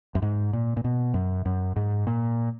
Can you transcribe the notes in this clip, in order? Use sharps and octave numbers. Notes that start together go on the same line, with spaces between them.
F#2
G#2
A#2
A#2
B2
F#2
F#2
G#2
A#2